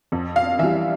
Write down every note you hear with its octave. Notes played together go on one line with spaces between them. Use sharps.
F2
F5
E3 G3 E5